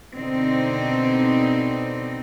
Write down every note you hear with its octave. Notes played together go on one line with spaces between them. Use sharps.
B2 D3 C4 D#4